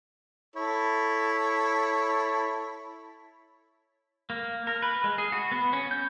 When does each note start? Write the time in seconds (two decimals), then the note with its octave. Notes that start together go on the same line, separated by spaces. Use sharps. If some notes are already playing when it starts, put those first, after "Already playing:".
0.56 E4 A4 C#5
4.30 A#3
4.67 A#4
4.82 B4
5.04 G#3
5.18 G#4
5.32 F#4
5.52 B3
5.73 C#4
5.91 G6